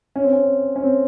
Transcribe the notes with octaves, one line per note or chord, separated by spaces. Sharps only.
C#4
C4
C#4
C#4
C4